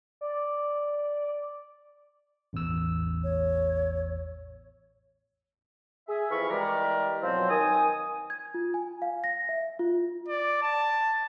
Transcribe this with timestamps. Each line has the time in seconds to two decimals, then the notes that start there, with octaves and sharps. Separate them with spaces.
0.21 D5
2.53 A1 E2 E6
3.24 C#5
6.08 G#4 E5
6.31 F2 E3 E4 F5 B5 C#6
6.49 E3 G3 G#3 A#4 D5
7.23 B2 F3 F#3 C4
7.49 D#3 G#5 D#6
8.30 G#6
8.54 F4
8.74 G#5
9.02 F5
9.24 A#6
9.49 E5
9.79 F4
10.28 D5
10.62 A5